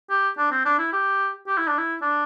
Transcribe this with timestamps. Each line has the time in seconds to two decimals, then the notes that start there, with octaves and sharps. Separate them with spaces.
0.10 G4
0.38 D4
0.52 C4
0.65 D4
0.79 E4
0.93 G4
1.47 G4
1.57 E4
1.67 D4
1.78 E4
2.02 D4